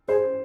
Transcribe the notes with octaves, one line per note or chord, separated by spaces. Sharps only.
G#4 C5